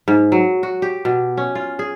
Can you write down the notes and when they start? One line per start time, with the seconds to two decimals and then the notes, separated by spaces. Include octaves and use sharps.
0.08 G#2
0.32 F#3
0.63 F#4
0.82 G4
1.05 B2
1.37 C#4
1.55 F4
1.79 G#4